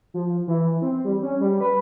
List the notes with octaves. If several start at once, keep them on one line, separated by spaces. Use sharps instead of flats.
F3
E3
C4
G3
C#4
G3
B4